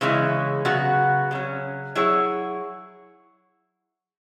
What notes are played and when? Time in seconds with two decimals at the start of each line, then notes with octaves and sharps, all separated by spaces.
0.01 C#3 E3 G#3 C#4 E4
0.65 C#3 F#3 B3 F#4
1.31 C#3 F#3 C#4
1.95 F#3 E4 G#4 C#5